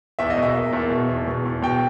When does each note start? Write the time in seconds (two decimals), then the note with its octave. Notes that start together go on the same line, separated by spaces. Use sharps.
0.19 E2 E5
0.30 D#5
0.37 B2
0.42 E5
0.54 A#3
0.73 E2
0.91 B2
1.09 E2
1.28 B2
1.45 E2
1.62 B2 G5